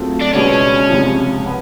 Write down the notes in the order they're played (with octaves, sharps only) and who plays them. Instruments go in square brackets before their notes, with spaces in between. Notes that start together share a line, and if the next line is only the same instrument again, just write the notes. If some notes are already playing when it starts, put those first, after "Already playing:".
Already playing: [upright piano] F#3 A3 C4 F4 G#4
[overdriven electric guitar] D4
[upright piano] C#2 B2 G#3 B3 D4 [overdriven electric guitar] C#4
[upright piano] C#2 C3 F3
B3